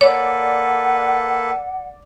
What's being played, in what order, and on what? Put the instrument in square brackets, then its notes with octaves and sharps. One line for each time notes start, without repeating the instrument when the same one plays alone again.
[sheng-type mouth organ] A#3 A4 B4 [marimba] C#5 [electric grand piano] D5 [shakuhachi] F#5